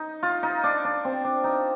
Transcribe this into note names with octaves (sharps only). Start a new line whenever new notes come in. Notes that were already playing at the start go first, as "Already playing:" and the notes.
Already playing: D#4
F4
D#4
D4
D4
C4
D4
D#4